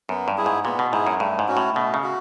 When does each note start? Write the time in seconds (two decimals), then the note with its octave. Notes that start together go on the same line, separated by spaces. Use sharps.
0.09 F#2 B3
0.28 G2
0.37 E4 G#4
0.46 G#2
0.65 A#2 B3
0.79 B2
0.93 G#2 E4 G#4
1.07 F#2
1.20 G2 A3
1.39 G#2
1.48 C#4 F#4
1.57 A2
1.76 B2 A3
1.94 C#3
2.03 F#4